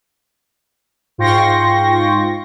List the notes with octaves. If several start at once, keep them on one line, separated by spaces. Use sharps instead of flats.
G#2 F4 G5 C6 C#6 A#6